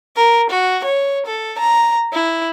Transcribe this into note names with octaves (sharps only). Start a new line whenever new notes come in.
A#4
F#4
C#5
A4
A#5
E4